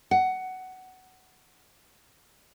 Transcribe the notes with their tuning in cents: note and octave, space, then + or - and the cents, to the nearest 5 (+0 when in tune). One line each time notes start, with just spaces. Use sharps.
F#5 +15